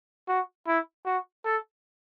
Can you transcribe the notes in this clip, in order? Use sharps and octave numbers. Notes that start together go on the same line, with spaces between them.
F#4
E4
F#4
A4